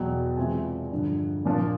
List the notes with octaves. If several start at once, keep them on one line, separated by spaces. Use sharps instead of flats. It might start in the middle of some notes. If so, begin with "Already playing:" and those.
Already playing: E2 B2 F#3 G5
C3 E3 G#3 C4 F4 G#5
G2 D3 F3
A#2 F3 A#3 D4 F4